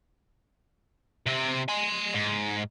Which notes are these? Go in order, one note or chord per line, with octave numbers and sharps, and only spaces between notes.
C3 C4
G#5 C6
G#2